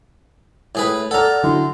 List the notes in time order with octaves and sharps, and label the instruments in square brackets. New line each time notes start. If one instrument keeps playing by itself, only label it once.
[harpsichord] A2 G#4 B4
[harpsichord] A4 A#5 [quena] D5 [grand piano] F#5 F6
[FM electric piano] D3 F#3 E4 [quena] C6